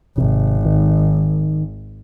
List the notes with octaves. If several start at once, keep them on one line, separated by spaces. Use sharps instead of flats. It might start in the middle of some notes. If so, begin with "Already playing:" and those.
G#1 C3
D#3